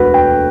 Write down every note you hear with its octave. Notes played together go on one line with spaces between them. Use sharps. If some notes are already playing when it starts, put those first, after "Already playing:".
Already playing: E1 D2 A3 F#4 B4
G5